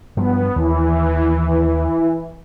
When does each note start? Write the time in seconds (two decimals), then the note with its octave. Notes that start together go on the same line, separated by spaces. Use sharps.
0.17 G2 F3 F#3 B3
0.56 D#2 E3